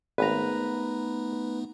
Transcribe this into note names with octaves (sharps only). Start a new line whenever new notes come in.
G#1 A3 B3 D#4 B4 A#5